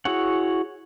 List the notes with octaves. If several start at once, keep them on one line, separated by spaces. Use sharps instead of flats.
E4 F#4 G#4 C#5 F#5